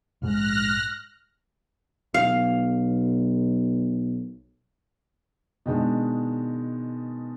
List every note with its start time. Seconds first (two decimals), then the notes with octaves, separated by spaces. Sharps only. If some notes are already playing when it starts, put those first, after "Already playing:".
0.22 A#1 G#2 G#3 F6 F#6 A#6
2.14 B1 F5
5.66 B2 D#3 G#3 D4